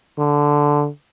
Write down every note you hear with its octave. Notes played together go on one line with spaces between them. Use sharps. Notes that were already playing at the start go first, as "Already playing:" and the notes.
D3